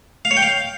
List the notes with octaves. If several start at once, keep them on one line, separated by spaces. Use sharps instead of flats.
F5
C#5
G5
F5